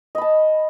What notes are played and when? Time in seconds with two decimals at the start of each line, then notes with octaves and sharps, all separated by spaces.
0.15 D#5
0.18 B5
0.22 A5